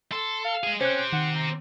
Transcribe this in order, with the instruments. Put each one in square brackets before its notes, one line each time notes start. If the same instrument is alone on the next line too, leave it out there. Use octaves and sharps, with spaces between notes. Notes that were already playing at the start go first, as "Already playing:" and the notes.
[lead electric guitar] A4 [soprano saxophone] C6
[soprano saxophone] F5
[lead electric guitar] G#3 G#4
[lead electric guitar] C4 G4 [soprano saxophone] C#4 [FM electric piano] C5 F#6
[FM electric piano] D#3 [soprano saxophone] F#5
[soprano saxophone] A#5